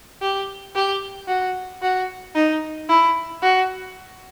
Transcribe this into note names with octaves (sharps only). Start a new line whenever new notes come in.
G4
G4
F#4
F#4
D#4
E4
F#4